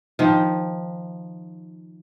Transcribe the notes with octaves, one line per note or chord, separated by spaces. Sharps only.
D#3 F3